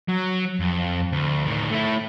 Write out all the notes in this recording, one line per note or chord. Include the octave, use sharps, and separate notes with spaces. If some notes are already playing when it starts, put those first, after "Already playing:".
F#3
F2
D2
A2 D#3
A3 E4